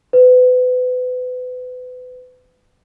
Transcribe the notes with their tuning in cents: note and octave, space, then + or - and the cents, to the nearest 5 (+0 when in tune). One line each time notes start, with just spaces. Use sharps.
B4 +30